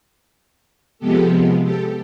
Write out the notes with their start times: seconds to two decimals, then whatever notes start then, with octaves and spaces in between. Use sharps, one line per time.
0.99 C3 F3 G#3 B3 G4 A4
1.64 G4 A4